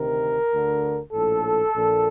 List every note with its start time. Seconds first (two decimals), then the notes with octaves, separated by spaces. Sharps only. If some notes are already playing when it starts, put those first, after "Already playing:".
Already playing: D2 C3 D#3 A#4
0.51 D2 D3
1.12 A#1 A2 A4
1.74 A#1 A#2